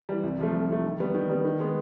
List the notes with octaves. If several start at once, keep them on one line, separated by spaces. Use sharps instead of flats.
E3 G3
C2
C3 F3 A3
C2
C3 F3 A3
D#3
G3 B3
D#3
G3 B3
D#3
G#3 B3